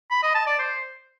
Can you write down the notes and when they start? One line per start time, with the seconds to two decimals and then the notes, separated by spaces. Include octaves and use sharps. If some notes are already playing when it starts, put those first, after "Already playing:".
0.11 B5
0.23 D#5
0.35 A5
0.47 D5
0.59 C5